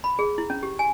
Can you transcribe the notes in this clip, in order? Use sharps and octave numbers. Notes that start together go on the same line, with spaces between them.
B5
G#4
E4
C#4
G4
G#5